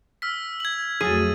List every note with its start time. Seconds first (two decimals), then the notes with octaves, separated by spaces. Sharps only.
0.22 E6 F6 B6
0.60 G#6 F#7
1.01 F2 F#3 A3 G#4 A6 D#7